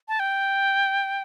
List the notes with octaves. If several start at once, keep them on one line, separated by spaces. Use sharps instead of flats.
A5
G5